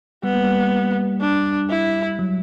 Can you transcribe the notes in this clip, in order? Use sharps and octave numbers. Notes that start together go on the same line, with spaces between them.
G3 B3
A#3
G3
D4
E4
F#3